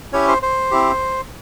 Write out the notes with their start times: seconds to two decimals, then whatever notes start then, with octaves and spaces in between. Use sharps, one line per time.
0.13 C#4 E4 G4 C#5
0.28 C5
0.42 C5
0.71 C4 E4 G4